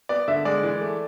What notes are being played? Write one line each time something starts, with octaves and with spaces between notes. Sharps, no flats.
B3 D5
D3 E5
G#3 D5
E3
A3